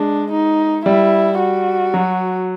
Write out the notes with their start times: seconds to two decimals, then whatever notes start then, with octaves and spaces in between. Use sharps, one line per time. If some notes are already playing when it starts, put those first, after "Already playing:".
Already playing: G#3 D4
0.32 D#4
0.86 G3 E4
1.40 F#4
1.94 F#3